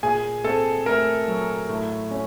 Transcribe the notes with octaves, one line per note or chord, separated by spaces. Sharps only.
A#2 G#4 G#5
C4 A4 A5
A3 A#4 A#5
F#3
A2
C#4